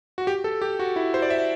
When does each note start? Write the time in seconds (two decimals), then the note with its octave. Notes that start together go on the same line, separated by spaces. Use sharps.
0.18 F#4
0.27 G4
0.44 A4
0.62 G4
0.79 F#4
0.96 E4
1.14 C5
1.22 D5
1.30 E5